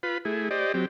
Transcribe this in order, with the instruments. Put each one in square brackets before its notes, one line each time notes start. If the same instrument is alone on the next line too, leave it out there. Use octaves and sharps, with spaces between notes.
[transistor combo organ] F4 B4 B5
A3 E4 G#4
G4 C5 D5 D#5
F#3 C4 G4